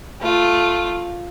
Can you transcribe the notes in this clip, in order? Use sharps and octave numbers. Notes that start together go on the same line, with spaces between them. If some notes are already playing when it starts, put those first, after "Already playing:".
A3 F4